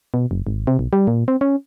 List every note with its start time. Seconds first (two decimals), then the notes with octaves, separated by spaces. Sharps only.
0.14 B2
0.31 F#1
0.47 G#1
0.67 C3
0.79 B1
0.93 G3
1.07 A#2
1.28 C4
1.41 C#4